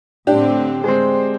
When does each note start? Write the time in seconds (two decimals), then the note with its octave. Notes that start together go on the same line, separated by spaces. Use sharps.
0.27 A2 D3 C4 D4 G4
0.84 G#3 C4 C5